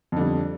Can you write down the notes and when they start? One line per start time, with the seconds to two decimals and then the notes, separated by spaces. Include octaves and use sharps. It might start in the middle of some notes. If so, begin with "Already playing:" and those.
0.12 F2
0.17 D3
0.21 G3